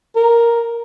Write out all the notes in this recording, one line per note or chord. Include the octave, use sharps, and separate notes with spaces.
A#4